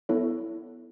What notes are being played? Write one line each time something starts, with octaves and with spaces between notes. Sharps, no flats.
B3 E4 A4 C#5